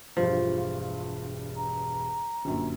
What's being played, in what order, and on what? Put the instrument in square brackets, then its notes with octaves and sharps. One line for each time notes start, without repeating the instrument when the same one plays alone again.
[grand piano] E1 G2 [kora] F3 [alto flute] F4
[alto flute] A#5
[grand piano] G1 F#2 A#2